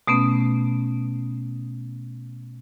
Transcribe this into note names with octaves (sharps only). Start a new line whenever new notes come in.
B2 A3 B3 C#4